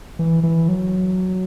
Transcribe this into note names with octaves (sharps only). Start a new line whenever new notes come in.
E3
E3
F#3